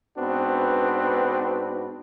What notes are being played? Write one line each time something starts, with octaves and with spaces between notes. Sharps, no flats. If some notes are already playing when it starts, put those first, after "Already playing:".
G#2 B3 C4 D4 F#4 B4